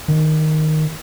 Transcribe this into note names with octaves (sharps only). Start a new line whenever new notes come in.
D#3